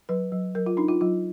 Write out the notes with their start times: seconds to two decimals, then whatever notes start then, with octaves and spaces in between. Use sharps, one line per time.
0.09 F#3 B4
0.32 F#3
0.55 F#3 A#4
0.66 F4
0.77 D4 D#4
0.88 F4
1.01 F#3 F4